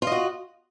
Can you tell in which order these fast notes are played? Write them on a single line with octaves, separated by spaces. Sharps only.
F4 D#5 F#4